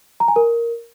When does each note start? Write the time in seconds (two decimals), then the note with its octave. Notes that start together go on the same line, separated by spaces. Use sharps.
0.20 A#5
0.28 G#5
0.36 A#4